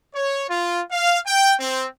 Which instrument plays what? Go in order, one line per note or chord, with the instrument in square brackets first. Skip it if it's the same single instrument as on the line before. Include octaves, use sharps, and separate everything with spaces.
[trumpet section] C#5
F4
F5
G5
C4